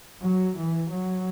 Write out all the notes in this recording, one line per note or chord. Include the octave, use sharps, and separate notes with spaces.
F#3
E3
F#3